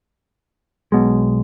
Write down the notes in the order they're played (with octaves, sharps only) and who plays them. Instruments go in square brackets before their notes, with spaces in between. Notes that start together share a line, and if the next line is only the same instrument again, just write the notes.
[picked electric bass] B1 B2 G#3